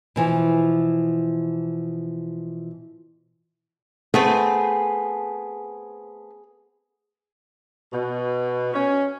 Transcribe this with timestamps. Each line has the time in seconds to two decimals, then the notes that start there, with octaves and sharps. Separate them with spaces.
0.16 B2 E3 F3
4.14 A3 B3 C4 G#4
7.93 B2
8.73 C#4